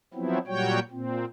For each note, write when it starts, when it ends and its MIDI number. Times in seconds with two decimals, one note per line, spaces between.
0.14 0.38 53
0.14 0.38 54
0.14 0.38 59
0.14 0.38 60
0.14 0.38 64
0.47 0.79 46
0.47 0.79 54
0.47 0.79 55
0.47 0.79 66
0.47 0.79 73
0.47 0.79 79
0.91 1.25 46
0.91 1.25 60